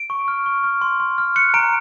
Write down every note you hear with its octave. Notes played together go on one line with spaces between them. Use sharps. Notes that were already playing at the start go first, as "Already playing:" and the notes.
Already playing: D7
C#6
F6
C#6
F6
C6
C6
F6
F#6 C#7
A#5 D7